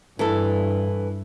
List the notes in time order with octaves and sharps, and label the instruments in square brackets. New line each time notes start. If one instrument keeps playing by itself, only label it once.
[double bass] G2 [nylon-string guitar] E3 A4